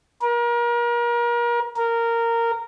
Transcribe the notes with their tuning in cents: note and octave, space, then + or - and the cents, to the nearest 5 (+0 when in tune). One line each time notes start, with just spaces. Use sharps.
A#4 +35
A#4 -10